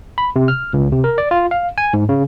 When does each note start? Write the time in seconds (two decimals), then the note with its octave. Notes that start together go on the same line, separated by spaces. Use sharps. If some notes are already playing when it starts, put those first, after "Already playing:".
0.18 B5
0.36 C3
0.48 F6
0.73 C#2
0.92 C3
1.04 A#4
1.18 D5
1.31 F4
1.51 F5
1.78 G#5
1.93 G#2
2.09 C#3